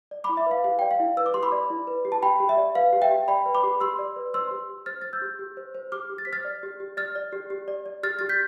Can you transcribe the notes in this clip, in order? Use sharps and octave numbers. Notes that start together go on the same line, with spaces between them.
D5
E4 B5 D6
E5
B4 F5
G4 F5
D5 G5
F5
E4
B4 E6
D6
G4 C6
B5 D6
D5
E4
B4
G4
A5
G4 G5 B5
G4
E5
D5
B4 F5
G4
E5 G5
G4
D5 G5 B5
B4
B5 D6
G4
G4 C6 E6
D5
B4
C5 C6 E6
G4
G4
C5 F6 A6
C5 A6
E6 G6
G4
G4
C5
C5
G4 D6 F6
G4
A6
C5 B6
F6 A6
D5
G4
G4
D5 F6 A6
D5
G4
G4
D5
D5
G4 F6 A6
G4 A6
G6 B6